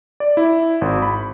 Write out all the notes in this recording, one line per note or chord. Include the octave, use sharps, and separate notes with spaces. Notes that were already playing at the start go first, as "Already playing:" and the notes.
D5
E4
G#1
B5